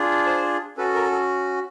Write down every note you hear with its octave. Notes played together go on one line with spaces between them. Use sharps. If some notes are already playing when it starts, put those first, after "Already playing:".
Already playing: D4 F4 G#4
C5
C#4 F#4 A4 B4
A#4
A4